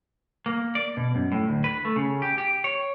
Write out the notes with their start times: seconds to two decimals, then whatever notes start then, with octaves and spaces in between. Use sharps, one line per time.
0.46 A#3
0.75 D5
0.97 B2
1.15 F#2
1.32 A2
1.48 D2
1.64 B4
1.85 A3
1.96 C#3
2.22 G4
2.38 G4
2.64 C#5